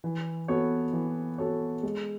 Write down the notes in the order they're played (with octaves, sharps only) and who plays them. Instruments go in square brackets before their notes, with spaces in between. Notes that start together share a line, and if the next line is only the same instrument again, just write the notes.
[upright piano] E3
B3 F#4 A4 C#5
E3
B3 F#4 A4 C#5
G#3